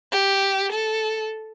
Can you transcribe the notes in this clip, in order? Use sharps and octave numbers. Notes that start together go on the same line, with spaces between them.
G4
A4